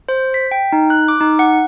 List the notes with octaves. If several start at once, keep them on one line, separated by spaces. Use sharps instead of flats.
C5
B6
G5
D#4
F#6
D6
D#4
F#5